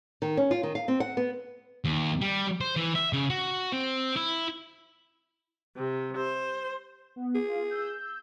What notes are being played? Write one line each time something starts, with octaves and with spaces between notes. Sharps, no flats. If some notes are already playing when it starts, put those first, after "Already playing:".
D#3
C#4
F4
D#3
F5
C4
F#5
B3
D#2
G3
C5
E3
E5
C#3
F#4
C4
E4
C3
C5
B3
G#4
F4
E6 G6